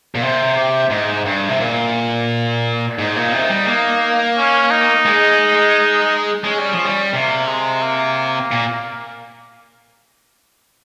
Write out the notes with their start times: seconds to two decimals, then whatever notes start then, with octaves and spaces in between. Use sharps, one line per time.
0.15 A#2
0.21 C3 C5
0.56 G4
0.90 G#2 D#4
1.26 G2
1.49 C3
1.60 A#2
2.99 G#2 D#4
3.16 A#2
3.32 C3
3.50 G3
3.67 A#3
4.37 C#4
4.70 D#4
5.06 G#3
6.44 G#3 C#4
6.58 G3
6.72 F3
6.85 G3
7.13 C3 A#3
7.48 G#3
7.82 A#3
8.52 A#2